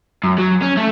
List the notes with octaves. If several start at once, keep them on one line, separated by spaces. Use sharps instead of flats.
F#2
F#3
C#4
A3